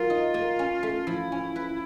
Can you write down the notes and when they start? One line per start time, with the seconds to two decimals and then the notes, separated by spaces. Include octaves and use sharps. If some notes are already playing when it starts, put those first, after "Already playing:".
Already playing: F#3 A#3 F4
0.10 D#4
0.34 A#3
0.59 C#4
0.83 A3
1.07 F3 E4
1.32 C#4
1.56 B4